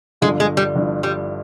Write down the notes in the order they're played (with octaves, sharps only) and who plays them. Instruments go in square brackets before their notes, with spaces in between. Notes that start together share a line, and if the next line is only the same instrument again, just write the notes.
[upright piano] G1 G2 D3 F3 [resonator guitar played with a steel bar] G#3
[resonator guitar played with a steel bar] G#3
G3
[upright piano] G1 G2 D3 F3
[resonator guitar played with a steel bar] G3